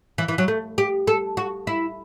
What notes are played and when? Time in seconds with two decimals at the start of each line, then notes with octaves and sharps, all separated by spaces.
0.18 E3
0.28 E3
0.38 F#3
0.48 A3
0.78 G4
1.07 A4
1.37 F#4
1.67 E4